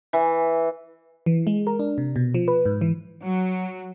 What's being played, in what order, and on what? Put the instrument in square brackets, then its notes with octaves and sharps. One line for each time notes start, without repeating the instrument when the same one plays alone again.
[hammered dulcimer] E3
[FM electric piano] E3
G#3
A#4
D4
C3
B2
F3
B4
G#2
E3
[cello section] F#3